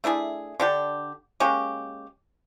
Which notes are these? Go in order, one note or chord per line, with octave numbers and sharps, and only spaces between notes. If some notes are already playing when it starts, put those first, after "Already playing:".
A3 D4 E4 G#4
D3 D4 G4
G#3 A#3 C#4 G4